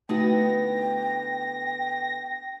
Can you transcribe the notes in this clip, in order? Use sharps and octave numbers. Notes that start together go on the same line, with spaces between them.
D3 A3 B3 D#4 E4 F#4 G5 A#6